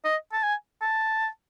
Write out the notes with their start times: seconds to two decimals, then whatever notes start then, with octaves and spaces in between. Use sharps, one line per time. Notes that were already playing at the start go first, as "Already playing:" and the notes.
0.05 D#5
0.33 A5
0.43 G#5
0.82 A5